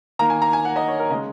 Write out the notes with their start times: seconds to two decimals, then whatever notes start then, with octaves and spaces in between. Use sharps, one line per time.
0.19 D#3 A#3 A#5
0.30 G#5
0.42 A#5
0.53 G#5
0.65 F#5
0.76 D#5
0.88 C#5
1.00 A#4
1.10 C#3 D#5
1.14 G#3